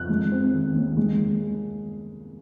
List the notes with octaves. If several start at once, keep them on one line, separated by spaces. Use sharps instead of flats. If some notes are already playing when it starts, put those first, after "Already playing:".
Already playing: F2 F#6
G#3
C4
D#3
D#2
G#3